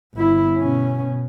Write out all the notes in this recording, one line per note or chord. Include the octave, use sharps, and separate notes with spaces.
G1 E4
B2 C#4